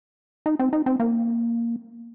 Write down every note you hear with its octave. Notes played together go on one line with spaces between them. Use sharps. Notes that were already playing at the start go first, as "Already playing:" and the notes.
D#4
C4
D#4
C4
A#3